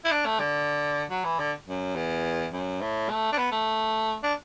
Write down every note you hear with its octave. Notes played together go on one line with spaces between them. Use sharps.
E4
D4
A3
D3
F#3
E3
D3
F#2
E2
F#2
A2
A3
D4
B3
A3
D4